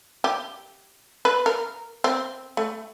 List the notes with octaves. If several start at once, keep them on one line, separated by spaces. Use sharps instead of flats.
G4
B4
A#4
C4
A3